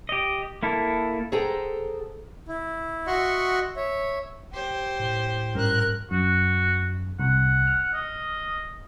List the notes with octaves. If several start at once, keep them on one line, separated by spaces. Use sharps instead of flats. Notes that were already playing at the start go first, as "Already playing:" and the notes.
G4 D#5
A#3 E4 A4
G#4 A4 C5 F#5 G5 A#5
E4
F#4 D#5 E5 F#5 C6 C#6
C#5 E5
G4 C5
A2
G#2 G3 C#4 A#4 F#6
F#2 F#4
C2 F#5
F6
D#5